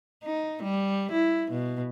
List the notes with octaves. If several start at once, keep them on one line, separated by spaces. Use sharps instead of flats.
D#4
G3
E4
B2